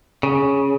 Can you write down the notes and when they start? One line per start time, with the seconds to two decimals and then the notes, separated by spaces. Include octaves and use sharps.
0.23 C#3